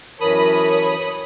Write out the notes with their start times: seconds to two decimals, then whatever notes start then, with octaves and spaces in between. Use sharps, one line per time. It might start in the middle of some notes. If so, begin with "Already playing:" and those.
0.20 F#2 E3 A#4 C#5 A5 B5 D#6